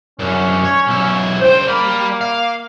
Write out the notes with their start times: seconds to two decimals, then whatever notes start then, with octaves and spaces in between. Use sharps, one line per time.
0.19 F#2 D3 C#4
0.64 C#5
0.88 B1 E4
1.40 C#2 C5 G5
1.67 G3 A#3 B5
2.21 F5